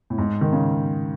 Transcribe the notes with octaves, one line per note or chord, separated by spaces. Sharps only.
A2
G#2
D#3
C#3